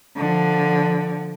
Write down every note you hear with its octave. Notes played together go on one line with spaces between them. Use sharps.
D3 F3